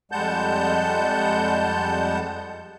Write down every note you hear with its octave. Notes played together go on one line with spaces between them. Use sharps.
F2 G3 G#3 F#5 A5 G6